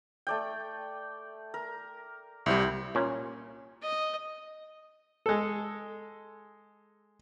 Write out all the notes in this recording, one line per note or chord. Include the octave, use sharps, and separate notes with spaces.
A3 D5 G5
A#4
C2 G3 E4 C5
A#2 C#4
D#5
G#3 A4